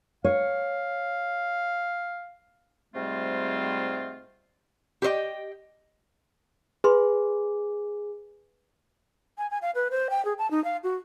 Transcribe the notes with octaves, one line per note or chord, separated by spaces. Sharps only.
C#5 F5
G#2 C3 G3 A3 C4 F4
G4 B4 C5 D#5 G5
G#4 B4 B5 C6
G#5
G#5
F5
B4
C5
G5
G#4
A5
D#4
F5
F#4